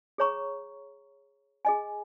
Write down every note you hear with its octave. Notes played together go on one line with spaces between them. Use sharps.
G#4 C#5 A#5 C#6
G#4 D#5 G#5